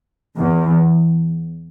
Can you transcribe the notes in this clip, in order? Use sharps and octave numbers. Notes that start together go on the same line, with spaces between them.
E2